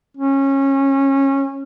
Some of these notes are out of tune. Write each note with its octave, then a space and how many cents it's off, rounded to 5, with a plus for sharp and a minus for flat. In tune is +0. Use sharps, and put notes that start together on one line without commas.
C#4 -20